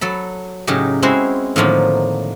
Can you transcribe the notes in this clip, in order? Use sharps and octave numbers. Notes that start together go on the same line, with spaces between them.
F#3 A4 B5
A2 C#3 F#3 D#4 G4
G#3 C4 C#4 E4 F#4 C5
A2 D3 D#3 F3 F#3 A#3